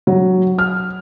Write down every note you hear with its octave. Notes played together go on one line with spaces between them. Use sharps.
F#3
F6